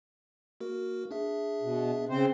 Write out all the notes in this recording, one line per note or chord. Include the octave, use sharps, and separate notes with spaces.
A#3 F#4 A#4
D4 G#4 E5
B2
C#3 C4 C5